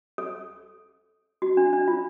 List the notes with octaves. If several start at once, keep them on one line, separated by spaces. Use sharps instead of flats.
A4
F#4
D4
D4
F4